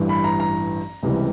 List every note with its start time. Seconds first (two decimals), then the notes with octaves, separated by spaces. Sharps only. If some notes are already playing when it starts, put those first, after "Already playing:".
Already playing: A1 G2 E3
0.09 B5
0.24 A#5
0.40 A#5
1.03 C#2 C3 E3 G3